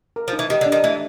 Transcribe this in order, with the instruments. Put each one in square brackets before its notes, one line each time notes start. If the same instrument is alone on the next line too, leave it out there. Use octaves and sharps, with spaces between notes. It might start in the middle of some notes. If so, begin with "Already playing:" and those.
[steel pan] A#4
[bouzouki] F3
[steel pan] D#4
[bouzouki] E3
[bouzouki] D#3 [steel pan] G4
[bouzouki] D3
[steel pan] D4
[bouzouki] D#3
[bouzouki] E3 [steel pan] A3